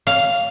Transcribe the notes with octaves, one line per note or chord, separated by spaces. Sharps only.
F5